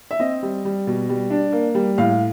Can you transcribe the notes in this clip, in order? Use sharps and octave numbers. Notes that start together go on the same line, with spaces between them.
E5
C4 D#5
G3
G3
B2
G3
D4
A#3
G3
A2 F5